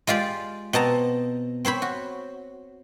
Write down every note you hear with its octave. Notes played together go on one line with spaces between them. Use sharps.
G#3 F4 G4 D5
B2 C4 A5 A#5
C4 C5 C#5 B5
F#4